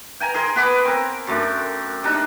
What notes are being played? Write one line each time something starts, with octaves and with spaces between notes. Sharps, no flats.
G5 G#5 A#5
G#4 A#4 C6
B3 B4 B5 D6
C4 A#4
F#2 A3 D4
C3 D4 D#4